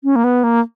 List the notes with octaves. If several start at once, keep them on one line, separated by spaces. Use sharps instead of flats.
C#4
A#3
B3
A#3